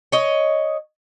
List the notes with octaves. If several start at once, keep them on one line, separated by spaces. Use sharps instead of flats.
C#5 D#5